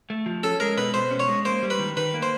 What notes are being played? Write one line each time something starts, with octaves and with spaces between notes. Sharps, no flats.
A3
F3
C#4 A4
G#3 A#4
B2 B4
B2 C5
C#4
C#5
G#3
A#3 C5
G3
B4
D#3
D#3 B4
A#3
C5